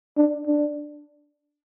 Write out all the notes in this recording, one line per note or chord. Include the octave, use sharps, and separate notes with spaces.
D4
D4